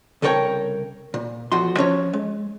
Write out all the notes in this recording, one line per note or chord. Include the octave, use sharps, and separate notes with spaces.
C2 C#3 A4 A#4 C#5 G5
A#2
B1 E2 F3 F#4 C6
F3 C#4 C#5
G#3